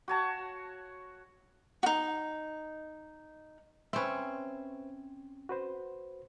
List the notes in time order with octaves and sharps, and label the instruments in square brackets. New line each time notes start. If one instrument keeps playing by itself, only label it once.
[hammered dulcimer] F#4 C#5 A5
[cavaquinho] D#4 F#4
[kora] C4 C#4 [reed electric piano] B4 C5 E5
[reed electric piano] F#4 B4 C5